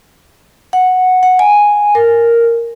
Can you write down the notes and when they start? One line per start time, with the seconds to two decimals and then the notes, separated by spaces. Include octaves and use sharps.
0.73 F#5
1.23 F#5
1.39 G#5
1.95 A#4